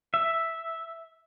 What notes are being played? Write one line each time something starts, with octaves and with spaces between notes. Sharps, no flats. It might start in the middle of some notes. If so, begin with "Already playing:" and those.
E5